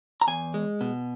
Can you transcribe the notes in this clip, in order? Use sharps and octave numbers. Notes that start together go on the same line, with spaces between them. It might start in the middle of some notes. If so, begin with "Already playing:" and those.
A#5
E2 G#5
G#3
B2